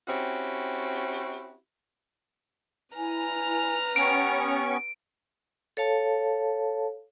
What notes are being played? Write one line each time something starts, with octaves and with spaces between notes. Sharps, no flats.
C4 C#4 E4 F#4 G4
E4 B4 G#5 A#5 F6
B3 C#4 G4 G5 C#6 D7
A4 C#5 F5 A5